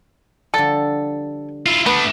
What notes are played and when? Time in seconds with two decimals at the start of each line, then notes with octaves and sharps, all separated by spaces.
0.54 D3 F3 G3 A4
1.66 E4 F4
1.86 A3 B3 D4